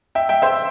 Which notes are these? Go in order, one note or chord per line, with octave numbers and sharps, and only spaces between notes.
E5 G5
E5 G5
C5 E5